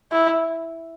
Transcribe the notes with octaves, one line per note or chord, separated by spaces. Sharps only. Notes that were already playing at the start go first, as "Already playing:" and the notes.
E4